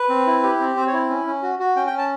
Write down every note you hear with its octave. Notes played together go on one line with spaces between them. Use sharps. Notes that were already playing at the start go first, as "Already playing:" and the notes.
Already playing: B4
C4
E4
G4
C4
C4 C5
C#5
E4
C#4
C#4
F#4
F#4
C#4 G5
G5
C#4
A5